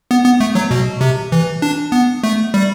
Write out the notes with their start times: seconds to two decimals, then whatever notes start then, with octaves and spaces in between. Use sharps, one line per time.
0.11 B3
0.25 B3
0.40 A3
0.55 F#3
0.71 B2
1.01 C3
1.32 E3
1.62 D4
1.92 B3
2.23 A3
2.54 G3